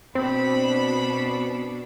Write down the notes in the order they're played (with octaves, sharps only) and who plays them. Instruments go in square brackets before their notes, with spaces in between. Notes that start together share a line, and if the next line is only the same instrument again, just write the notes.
[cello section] B2 D4 [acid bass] C4 [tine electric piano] C5 [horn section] B5